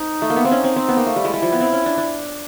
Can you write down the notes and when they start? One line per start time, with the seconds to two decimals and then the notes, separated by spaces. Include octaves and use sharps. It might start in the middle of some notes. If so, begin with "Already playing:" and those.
Already playing: C4 D#4
0.22 A3
0.30 A#3
0.36 B3
0.45 C4
0.51 C#4 D#4
0.64 C4
0.76 C4
0.88 B3
0.97 A#3
1.06 A3
1.16 G3
1.24 G#3 E4
1.34 G3
1.42 F3
1.52 B3
1.60 C4
1.72 C#4
1.86 D4
1.97 D4